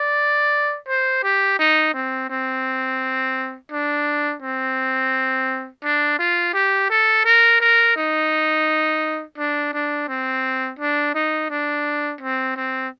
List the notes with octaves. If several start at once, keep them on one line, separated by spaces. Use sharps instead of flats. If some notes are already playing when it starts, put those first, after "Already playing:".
Already playing: D5
C5
G4
D#4
C4
C4
D4
C4
D4
F4
G4
A4
A#4
A#4
D#4
D4
D4
C4
D4
D#4
D4
C4
C4